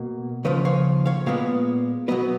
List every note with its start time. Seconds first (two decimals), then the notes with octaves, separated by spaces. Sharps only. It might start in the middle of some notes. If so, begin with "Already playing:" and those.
Already playing: B2 A#3
0.44 D#2 C#3 F3 B4 D#5
0.65 C#5 F5
1.06 C#5 F5
1.26 A#2 G#3 B3 C#5 F5
2.08 B2 F#3 B3 B4 D#5